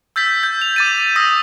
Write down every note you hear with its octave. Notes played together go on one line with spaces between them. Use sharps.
E6 G6 A6 B6
G6
F7
D6 A6 D#7
D#6 E6 A#6 D#7